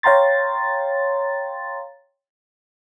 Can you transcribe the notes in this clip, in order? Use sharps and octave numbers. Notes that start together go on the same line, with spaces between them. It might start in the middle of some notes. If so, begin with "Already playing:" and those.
C#5 F5 G5 A#5 C6 A6